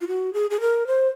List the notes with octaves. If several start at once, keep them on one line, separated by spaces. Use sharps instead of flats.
F4
F#4
G#4
G#4
A#4
C5